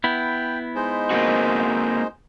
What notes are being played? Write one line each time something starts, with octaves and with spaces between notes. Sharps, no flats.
B3 E4 G5
G#3 D#4 C5
A#3 C4 F#4